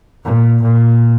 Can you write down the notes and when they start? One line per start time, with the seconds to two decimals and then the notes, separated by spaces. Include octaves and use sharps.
0.24 A#2
0.62 A#2